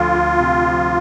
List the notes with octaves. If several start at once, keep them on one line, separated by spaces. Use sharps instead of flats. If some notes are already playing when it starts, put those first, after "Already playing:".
Already playing: D2 F3 F4
D2
C3
F3